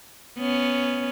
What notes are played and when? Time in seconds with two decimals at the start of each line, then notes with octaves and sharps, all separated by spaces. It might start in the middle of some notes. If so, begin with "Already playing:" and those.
0.38 B3 C#4